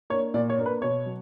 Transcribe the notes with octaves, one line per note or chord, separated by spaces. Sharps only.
A#3 D4 C#5
A#2 D5
C#5
A#3 D4
B4
B2 C#5
F#3